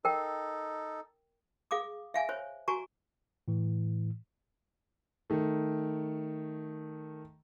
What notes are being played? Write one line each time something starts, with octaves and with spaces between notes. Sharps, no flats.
D#4 A4 A#4 G5
G#4 F5 D6 D#6
E5 F5 G#5
C5 C#5
F#4 G#5 A#5 C#6
A2 E3
D#3 A3